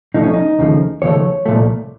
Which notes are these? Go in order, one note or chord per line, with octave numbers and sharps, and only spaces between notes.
C2 C3 F3 A3 D#4
C#4
D#4
D#2 C#3 F3 A3
D#2 C#3 F3 A3 C#5
C2 A#2 F3 A3